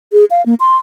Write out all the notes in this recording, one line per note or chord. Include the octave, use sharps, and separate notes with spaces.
G#4
F5
A#3
C6